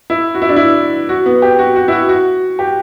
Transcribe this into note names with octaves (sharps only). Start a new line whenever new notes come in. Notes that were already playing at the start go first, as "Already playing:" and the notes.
E4
F#4
E4
D4
E4
F#4
B3
G4
F#4
F#4
E4
F#4
F#4
G4